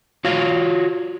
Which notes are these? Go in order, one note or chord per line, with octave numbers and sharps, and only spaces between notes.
F4 F#4 C#5 F5